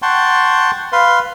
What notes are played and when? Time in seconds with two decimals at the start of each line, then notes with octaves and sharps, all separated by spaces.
0.02 F#5 G5 A5 C6 C#6
0.92 B4 F5 C6